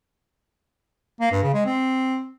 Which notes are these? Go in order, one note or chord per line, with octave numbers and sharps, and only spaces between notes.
A#3
G2
C#3
G#3
C4